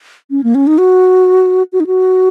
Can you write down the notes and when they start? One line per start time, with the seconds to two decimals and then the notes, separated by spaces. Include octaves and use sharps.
0.31 C#4
0.44 A#3
0.55 C#4
0.67 D#4
0.78 F#4
1.73 F#4
1.80 D#4
1.87 F#4